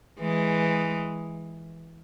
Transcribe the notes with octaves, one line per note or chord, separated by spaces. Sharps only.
E3 G#3